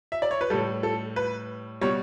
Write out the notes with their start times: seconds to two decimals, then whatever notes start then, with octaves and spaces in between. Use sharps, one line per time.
0.12 E5
0.22 D5
0.31 C#5
0.41 B4
0.50 A2 G3 A4
0.83 A4
1.16 B4
1.81 B2 G3 C#5